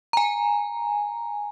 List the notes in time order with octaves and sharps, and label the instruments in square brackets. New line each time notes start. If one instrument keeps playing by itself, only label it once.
[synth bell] G#5 A#5